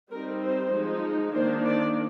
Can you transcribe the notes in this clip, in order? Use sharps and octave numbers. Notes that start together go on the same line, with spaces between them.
G3 C4 D#4 A#4
C5
F3 G#3 D#4
D#3 A#3 D4 C5
D5